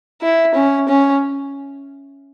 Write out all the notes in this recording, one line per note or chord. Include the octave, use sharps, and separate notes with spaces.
E4
C#4
C#4